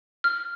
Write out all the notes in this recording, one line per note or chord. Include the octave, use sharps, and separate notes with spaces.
F6